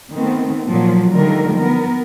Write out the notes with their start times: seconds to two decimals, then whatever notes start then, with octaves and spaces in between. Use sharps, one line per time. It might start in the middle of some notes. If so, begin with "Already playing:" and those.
0.12 D#3 A3 B3 C4
0.68 A#2 F3 F#3
1.11 D3 D#3 F3 G3 A3 A#4
1.58 B3 A#4